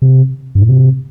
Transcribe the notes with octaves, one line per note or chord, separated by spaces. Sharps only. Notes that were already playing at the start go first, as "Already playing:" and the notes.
C3
G2
A2
C3